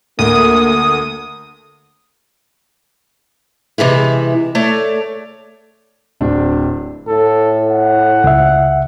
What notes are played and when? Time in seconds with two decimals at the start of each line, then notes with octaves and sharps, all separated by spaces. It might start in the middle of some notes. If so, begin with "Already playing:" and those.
0.19 D2 A#3 D#6
3.78 C3 E3 G#3 E4
4.55 A3 C#5 D5
6.21 D1 C4 D4
7.08 A2 A4
7.68 F#5
8.24 C#2 E5